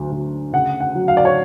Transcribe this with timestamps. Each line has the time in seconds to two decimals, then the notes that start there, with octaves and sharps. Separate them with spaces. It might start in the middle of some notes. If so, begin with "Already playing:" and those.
Already playing: D2 D3 F#3
0.11 D2
0.52 C#3 F#5
0.80 F#5
0.95 F#3
1.08 F5
1.17 D5
1.25 C#5